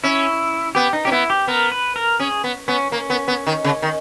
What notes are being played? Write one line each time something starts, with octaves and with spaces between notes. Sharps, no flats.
C#4 E4
B3 G4
D#4
C#4 G4
B3 E4
G4
B3 A#4
B4
A#4
C#4 G#4
B3
B3 C#4
A#3 C#4
B3
B3
D#3
C#3
D#3